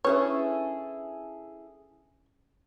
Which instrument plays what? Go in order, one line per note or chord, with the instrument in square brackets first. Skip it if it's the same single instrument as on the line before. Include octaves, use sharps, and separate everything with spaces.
[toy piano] C#4 D4 B4 [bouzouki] E4 G#4 A4 [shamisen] C#5